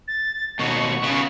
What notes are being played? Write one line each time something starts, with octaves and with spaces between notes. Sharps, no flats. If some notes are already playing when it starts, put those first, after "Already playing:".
A6
D#2 B2 C#6
C#3 B3